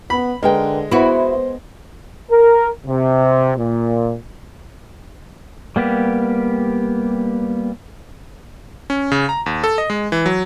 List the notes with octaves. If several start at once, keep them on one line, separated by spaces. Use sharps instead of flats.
B3 B5
D3 G#3 A#4 B4 G5
B3 E4 F#4 C5
A#4
C3
A#2
G3 A#3 B3 G4
C#4
C#3
A#5
D#2
A4
D#5
G#3
E3
F#3